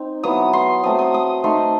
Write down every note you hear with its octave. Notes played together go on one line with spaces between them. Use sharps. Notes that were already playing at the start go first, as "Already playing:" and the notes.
Already playing: C4 D#4
F#3 B3 E4 D#6
C6
F#3 A3 C4 D#6
D#6
D#6
A3 D#4 C6